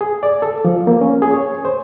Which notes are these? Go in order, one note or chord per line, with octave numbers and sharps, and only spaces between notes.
G#4
D5
A4
F3
A#3
C#4
G#4
C#5
C5